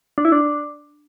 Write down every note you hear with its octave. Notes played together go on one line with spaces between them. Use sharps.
D4
E4
D4